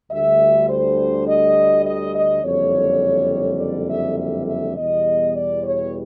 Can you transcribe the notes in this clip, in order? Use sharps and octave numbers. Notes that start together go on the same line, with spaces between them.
D2 D3 G3 E5
C5
D#5
D#5
D#5
F#1 F2 D3 G3 C#5
D5
E5
E5
E5
E2 B2 G3 D#5
D5
C#5